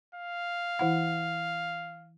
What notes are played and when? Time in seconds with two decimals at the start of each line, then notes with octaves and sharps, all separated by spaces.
0.15 F5
0.79 E3 E4 F#5